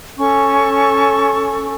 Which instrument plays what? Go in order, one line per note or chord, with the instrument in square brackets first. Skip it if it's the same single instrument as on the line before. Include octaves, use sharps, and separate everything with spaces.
[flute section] C#4 A4 C#6